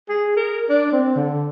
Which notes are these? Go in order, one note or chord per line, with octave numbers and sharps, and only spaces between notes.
G#4
A#4
D4
C4
D3